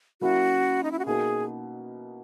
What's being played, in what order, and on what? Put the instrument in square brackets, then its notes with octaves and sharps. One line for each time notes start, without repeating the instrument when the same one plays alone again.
[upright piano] F#3 A#3 C#4 E4 [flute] F#4
[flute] D#4
E4
F#4
[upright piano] B2 A#3 D#4 [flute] G#4